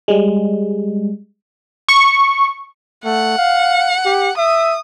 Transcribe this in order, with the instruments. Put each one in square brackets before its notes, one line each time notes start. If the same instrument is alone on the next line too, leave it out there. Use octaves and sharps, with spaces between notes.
[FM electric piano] G3 G#3
[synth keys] C#6
[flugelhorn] A3 [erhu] F#5
[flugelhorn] F5
G4
[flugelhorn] E5 [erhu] D#6